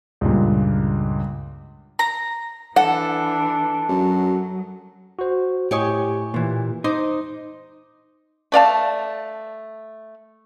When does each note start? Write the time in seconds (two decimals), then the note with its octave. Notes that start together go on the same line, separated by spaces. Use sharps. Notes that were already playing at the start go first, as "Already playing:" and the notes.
0.21 C#2 G2 A#2
1.99 A#5
2.76 E3 D4 A4 F#5
3.89 F#2 F#3
5.19 F#4 C5
5.71 A2 G4 C#5 D#5 G#5 C#6
6.34 A#2 E3
6.84 D#4 C5 C6 D6 D#6
8.52 A3 D5 F5 A5